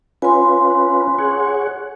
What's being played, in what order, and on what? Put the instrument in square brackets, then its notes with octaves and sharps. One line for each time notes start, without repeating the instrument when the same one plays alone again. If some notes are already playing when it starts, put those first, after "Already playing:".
[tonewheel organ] C#4 F4 B4 [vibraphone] G#5 C6
[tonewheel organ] G#4 C#5 F#5